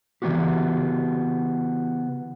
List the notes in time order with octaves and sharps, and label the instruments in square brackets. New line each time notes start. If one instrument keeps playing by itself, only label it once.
[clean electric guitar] C#3 E3 B3 C#4 F#4 G4